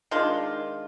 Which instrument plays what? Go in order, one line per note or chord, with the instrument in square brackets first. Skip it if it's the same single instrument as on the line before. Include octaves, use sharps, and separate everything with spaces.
[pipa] D#3 G#3 D4 F4